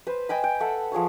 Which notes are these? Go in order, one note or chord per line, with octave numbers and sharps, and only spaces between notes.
B4 C5
D#5 G5 G#5 B5
G5
A4 E5 F#5
F3 G#4 C#5 C#6